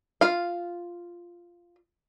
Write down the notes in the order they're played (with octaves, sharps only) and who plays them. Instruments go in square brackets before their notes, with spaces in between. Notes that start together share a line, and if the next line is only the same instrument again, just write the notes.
[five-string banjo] F4 F5